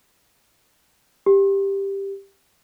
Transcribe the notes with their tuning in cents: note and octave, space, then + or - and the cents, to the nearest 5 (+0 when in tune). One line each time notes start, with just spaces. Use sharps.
G4 +5